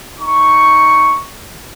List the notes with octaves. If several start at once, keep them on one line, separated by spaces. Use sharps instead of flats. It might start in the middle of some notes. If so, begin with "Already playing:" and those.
D#4 C#6